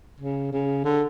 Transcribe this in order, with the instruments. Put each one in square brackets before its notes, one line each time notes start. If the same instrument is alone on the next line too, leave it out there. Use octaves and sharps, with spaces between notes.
[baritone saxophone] C#3
C#3
D3